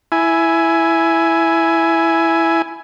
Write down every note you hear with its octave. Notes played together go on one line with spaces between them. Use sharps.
E4 G#5